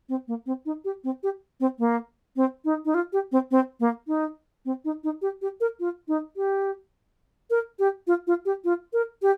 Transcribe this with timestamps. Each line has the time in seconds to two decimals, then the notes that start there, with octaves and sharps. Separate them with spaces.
0.09 C4
0.28 A#3
0.46 C4
0.66 D#4
0.85 G4
1.04 C4
1.23 G4
1.60 C4
1.79 A#3
2.36 C4
2.65 D#4
2.85 D#4
2.94 F4
3.13 G4
3.32 C4
3.51 C4
3.80 A#3
4.07 D#4
4.65 C4
4.85 D#4
5.04 D#4
5.22 G4
5.42 G4
5.61 A#4
5.80 F4
6.08 D#4
6.37 G4
7.50 A#4
7.79 G4
8.07 F4
8.27 F4
8.45 G4
8.65 F4
8.93 A#4
9.22 G4